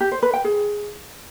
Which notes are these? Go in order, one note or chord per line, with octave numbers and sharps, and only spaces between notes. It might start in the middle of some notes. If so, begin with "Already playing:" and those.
G4
C5
B4
G5
G#4